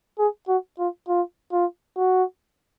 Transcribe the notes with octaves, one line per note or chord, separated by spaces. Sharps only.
G#4
F#4
F4
F4
F4
F#4